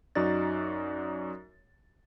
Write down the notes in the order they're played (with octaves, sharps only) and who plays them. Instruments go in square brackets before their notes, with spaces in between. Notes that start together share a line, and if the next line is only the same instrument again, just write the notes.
[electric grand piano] F#2 D#4 F#4 D5 A6